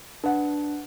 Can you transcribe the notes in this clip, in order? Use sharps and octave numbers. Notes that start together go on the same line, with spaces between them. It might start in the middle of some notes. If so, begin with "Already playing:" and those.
D4 B4 F#5